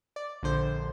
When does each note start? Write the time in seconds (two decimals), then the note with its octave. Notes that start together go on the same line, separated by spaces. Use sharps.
0.16 D5
0.43 A#1 D3 C5